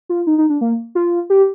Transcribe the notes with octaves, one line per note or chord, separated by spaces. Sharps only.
F4
D#4
D#4
D4
A#3
F4
G4